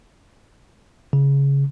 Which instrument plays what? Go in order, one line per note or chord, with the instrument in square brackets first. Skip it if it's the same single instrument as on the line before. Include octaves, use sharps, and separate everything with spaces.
[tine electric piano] C#3